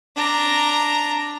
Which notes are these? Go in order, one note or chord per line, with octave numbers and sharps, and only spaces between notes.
D4 A#5